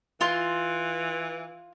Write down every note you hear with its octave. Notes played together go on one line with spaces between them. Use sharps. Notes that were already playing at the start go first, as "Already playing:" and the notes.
E3 F4 C6